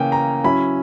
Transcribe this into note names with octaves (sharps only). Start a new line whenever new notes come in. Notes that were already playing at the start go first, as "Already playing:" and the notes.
Already playing: C#3 E3 A#3 C#4 G5
A#5
F#3 C#4 E4 B5